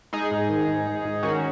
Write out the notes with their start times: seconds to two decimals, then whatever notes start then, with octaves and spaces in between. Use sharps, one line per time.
0.13 G#3 D#4 G#4
0.32 G#2
0.49 D#3
0.68 G#2
0.87 G#3
1.05 G#2
1.23 D#3 C#4 F#4